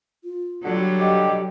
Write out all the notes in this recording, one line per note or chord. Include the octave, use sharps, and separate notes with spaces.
F4
D3 F#3 G3
G4 D#5